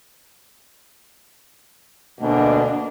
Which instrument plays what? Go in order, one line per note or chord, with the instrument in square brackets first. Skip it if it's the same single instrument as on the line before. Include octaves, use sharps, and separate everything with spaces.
[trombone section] D2 B2 [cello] A#3 D4